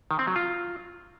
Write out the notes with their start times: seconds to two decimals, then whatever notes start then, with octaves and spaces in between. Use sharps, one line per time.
0.11 D#3
0.19 C4
0.27 F#3
0.36 F4